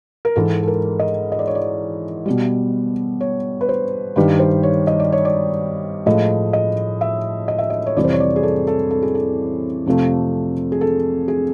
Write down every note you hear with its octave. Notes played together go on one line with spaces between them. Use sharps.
A#4
G#2 E3 G#3 A4
A4
A#4
D#5
D#5
D5
C#5
D5
B2 G3
C#5
B4
C5
G2 D#3 G3 B4
C5
C#5
D#5
D5
C#5
D5
A2 F3 G#3 D#5
D#5
E5
D#5
E5
D#5
C#5
F2 C3 E3 G3 D5
C5
C#5
D5
G#4
A4
A4
A4
G#4
A4
F2 C3 F3 A3
G#4
A4
G#4